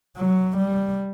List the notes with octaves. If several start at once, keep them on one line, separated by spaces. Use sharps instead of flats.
F#3
G3